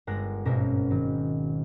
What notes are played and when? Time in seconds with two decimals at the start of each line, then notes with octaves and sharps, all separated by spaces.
0.07 G1 G#3 A#4 F#5 F#6 A#6
0.45 G#1 G2 B2 C#4 F#4 A#4
0.91 D#3 F#3